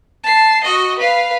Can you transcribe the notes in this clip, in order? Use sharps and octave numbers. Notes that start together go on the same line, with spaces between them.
A5 C7
F#4 D#5
B4 F5